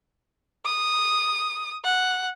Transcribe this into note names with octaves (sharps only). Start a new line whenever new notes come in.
D#6
F#5